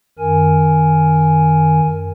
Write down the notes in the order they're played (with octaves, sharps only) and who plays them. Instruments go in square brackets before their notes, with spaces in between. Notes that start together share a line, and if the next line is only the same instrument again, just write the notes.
[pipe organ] F#2 D#3 A#4 G#5